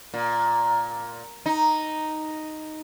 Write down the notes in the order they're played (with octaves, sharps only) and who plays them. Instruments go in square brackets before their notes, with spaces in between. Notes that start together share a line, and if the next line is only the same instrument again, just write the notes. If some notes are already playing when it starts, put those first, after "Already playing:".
[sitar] A#2
D#4